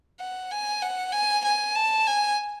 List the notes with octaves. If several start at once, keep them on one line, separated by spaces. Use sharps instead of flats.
F#5
G#5
F#5
G#5
G#5
A5
G#5